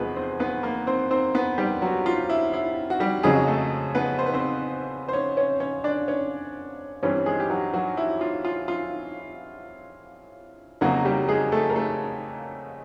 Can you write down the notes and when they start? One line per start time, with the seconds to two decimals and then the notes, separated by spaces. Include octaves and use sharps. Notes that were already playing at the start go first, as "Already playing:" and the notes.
Already playing: E2 C3 F3 G#3 B3 G#4 B4
0.16 C4 C5
0.39 B3 B4
0.63 A#3 A#4
0.87 C4 C5
1.11 C4 C5
1.35 B3 B4
1.58 G3 G4
1.82 F#3 F#4
2.06 F4
2.29 E4
2.53 E4
2.90 F#4
3.00 G3 G4
3.23 F2 C#3 F#3 G#3 G#4
3.48 A3 A4
3.95 B3 B4
4.19 C5
4.26 B4
4.34 C4 C5
5.08 C5
5.13 C#4 C#5
5.37 C#4 C#5
5.60 C#4 C#5
5.84 D4 D5
6.08 C#4 C#5
7.03 G2 E3 G3 C4 C#4 C#5
7.26 G#3 G#4
7.40 G4
7.50 F#3 F#4
7.74 F#3 F#4
7.97 E4
8.21 F4
8.45 F4
8.68 F4
10.81 F2 C#3 F#3 A#3 F#4
11.05 G3 G4
11.28 G#3 G#4
11.52 A3 A4
11.70 A#4
11.76 A3 A4